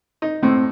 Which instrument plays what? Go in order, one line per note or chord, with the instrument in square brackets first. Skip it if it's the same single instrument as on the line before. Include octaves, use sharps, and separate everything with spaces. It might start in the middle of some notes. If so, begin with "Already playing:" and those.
[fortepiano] D#4
[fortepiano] A2 [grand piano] C4